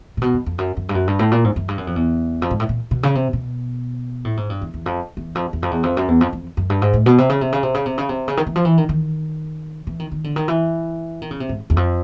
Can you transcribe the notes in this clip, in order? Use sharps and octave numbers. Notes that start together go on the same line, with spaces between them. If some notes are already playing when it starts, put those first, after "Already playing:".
A#2
B2
F#2
F2
F#2
F#2
G2
F#2
G2
A2
A#2
G#2
F#2
G2
F#2
F2
E2
F2
G#2
A2
A#2
B2
C#3
C3
B2
A2
G#2
G2
E2
E2
F2
E2
F2
E2
F2
E2
F2
F#2
E2
F2
F2
F#2
G2
G#2
A2
B2
C3
C#3
C3
C#3
C3
C#3
C3
C#3
C3
C#3
D#3
E3
F3
E3
D#3
D#3
E3
D#3
D#3
D3
D#3
E3
D#3
C#3
C3
G#2
E2
F2